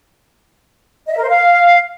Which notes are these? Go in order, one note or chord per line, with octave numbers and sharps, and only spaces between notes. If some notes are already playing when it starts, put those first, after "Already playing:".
D#5
E5
A#4
C5
F5